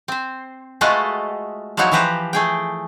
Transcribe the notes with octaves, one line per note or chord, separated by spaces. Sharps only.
C4 C5
G#3 A3 F4 F#4 B4 D#5
F3 F#3 D#4 E4 F#4 C#5
E3 F3 G4 B4 C5 A#5
A3 G#4 G5